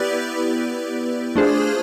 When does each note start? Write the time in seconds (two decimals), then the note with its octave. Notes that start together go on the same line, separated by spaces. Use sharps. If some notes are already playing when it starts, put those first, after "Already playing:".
Already playing: B3 E4 G4 B4 D5
1.36 A3 D4 F4 G#4 C5